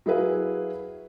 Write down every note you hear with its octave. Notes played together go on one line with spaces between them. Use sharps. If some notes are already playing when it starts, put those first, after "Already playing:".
F#3 E4 G#4 B4 F5